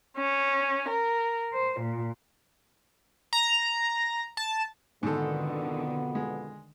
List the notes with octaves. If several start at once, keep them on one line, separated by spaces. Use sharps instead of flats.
C#4
A#4
C5
A#2
A#5
A5
F2 G#2 B2 D3 D#3 B3 A4
G#3